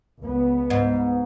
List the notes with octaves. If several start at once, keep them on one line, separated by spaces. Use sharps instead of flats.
C#2 B3
G#2